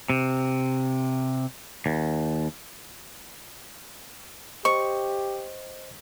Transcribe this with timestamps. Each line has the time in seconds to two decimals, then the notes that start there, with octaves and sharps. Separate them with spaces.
0.10 C3
1.86 D#2
4.65 G4 C5 D#5 C#6